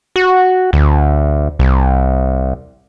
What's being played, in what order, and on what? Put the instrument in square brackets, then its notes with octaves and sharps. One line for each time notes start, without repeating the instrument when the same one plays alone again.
[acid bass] F#4
D2
C2